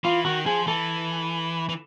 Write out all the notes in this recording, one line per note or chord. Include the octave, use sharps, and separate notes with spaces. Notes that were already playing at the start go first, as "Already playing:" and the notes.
E3 F4
D#3 F#4
F3 G#4
E3 A4
E3